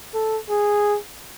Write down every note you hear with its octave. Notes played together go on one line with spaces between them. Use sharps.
A4
G#4